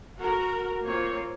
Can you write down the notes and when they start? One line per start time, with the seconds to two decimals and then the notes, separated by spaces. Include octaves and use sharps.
0.16 F#4 A#4
0.82 A#3 C4 F4 C#5